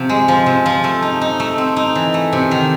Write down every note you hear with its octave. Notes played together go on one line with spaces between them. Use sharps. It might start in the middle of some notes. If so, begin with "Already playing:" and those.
Already playing: C3 F3
G#3
F3
C3
F3
A3
D#4
D#4
A3
C4
D#4
E3
A3
C3
D#3